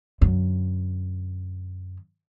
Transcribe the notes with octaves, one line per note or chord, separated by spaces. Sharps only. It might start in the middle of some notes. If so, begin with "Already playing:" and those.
F#2 D3